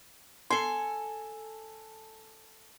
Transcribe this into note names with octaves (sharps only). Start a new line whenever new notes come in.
A4 G#5 C6